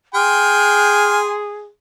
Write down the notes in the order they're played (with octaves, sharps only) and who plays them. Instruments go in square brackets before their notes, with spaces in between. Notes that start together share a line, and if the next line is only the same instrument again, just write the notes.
[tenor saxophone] G#4 [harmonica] G5 G#5 C6 [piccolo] F6